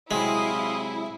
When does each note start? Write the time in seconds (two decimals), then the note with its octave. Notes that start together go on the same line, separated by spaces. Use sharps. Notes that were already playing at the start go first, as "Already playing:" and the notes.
0.11 C3 F#3 G#3 C4 E4 F5 C6 D#6